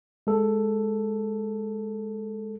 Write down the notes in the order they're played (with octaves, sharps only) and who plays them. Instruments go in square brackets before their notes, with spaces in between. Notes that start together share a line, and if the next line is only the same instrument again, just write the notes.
[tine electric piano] G#3 A4